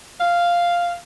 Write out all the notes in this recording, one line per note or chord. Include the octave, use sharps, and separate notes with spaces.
F5